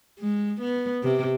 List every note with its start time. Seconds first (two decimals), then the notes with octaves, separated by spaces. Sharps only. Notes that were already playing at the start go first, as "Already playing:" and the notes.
0.19 G#3
0.61 B3
1.03 C3